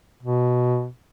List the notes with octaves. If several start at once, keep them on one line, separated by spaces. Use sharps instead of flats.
B2